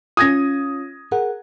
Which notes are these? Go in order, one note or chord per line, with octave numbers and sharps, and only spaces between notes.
C#4 F4 D#6 G#6 A#6
G#4 A#4 F#5